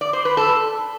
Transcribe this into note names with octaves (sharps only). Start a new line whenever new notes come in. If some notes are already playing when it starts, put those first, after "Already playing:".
D5
C5
B4
A4